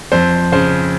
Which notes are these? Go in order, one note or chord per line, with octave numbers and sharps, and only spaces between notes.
F2 C5
C#3 C5